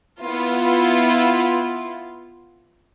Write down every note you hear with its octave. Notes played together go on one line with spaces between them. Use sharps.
B3 E4 F4